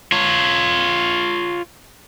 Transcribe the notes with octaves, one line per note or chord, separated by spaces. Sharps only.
F4 C#5